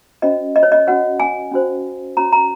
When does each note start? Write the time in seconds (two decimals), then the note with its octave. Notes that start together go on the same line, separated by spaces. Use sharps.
0.22 C#4 F#4 C5 D#5
0.56 D#5
0.63 C#5
0.72 D#5
0.87 C#4 F#4 C#5 F#5
1.20 G#5
1.51 C#4 F#4 C5
2.17 C#4 F#4 C#5 A#5
2.33 A#5